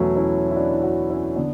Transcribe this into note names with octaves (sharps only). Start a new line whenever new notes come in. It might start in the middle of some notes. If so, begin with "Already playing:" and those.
Already playing: E2 B2 F#3 A3 C#4
C#4 E4
E4
D4 F#4
E4
D4 F#4
C#4 E4
D3 B3 D4